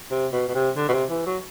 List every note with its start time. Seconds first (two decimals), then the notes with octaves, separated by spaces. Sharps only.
0.11 C3
0.33 B2
0.48 B2
0.54 C3
0.76 D3
0.88 B2
0.92 C3
1.10 E3
1.26 F#3